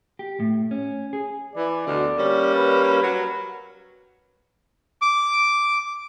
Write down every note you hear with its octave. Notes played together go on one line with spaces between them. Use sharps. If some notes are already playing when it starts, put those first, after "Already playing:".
G4
A2
C#4
G#4
E3 D5
D2 B2 D3
G3 A#3 C#4
B4
F#3
D6